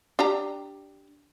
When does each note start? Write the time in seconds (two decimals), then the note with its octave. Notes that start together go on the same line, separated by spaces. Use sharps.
0.19 D4 G4 A#5